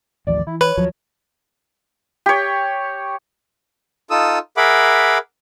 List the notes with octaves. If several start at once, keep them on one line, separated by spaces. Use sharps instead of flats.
A1 D#2 F3 D5
E3 E4
B4 C#5
D#2 F3 F#3
G4 C#5
D#4 F4 A4 D#6 E6
G#4 A#4 E5 F#5 B5 D6